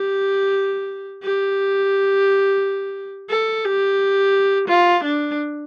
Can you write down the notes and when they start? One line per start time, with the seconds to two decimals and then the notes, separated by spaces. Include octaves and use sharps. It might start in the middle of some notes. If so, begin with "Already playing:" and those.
Already playing: G4
1.22 G4
3.29 A4
3.64 G4
4.68 F4
5.03 D4